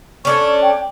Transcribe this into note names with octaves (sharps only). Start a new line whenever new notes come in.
C#4 D4 A4 C#6
G5